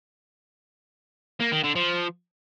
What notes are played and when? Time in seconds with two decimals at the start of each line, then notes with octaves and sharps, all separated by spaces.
1.40 A#3
1.52 D#3
1.64 D3
1.75 F3